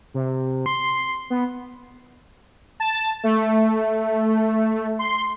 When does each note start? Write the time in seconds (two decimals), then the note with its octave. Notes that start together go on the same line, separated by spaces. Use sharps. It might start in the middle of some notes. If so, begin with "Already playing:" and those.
0.14 C3
0.66 C6
1.30 B3
2.80 A5
3.23 A3
4.99 C6